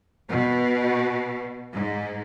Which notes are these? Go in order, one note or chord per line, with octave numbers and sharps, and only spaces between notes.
B2
G#2